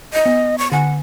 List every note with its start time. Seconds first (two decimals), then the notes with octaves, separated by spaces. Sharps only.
0.13 D#5
0.26 B3
0.58 C#6
0.72 D3 F#5 G#5